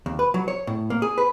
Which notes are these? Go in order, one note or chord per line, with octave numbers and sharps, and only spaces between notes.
D#2
B4
F#3
C#5
A2
A#3
G#4
B4